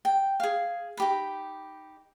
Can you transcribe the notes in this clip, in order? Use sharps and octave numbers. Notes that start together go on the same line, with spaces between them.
G5
G#4 F5
D#4 G4 B5